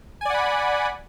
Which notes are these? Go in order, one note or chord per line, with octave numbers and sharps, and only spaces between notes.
D5 F#5 G#5 B5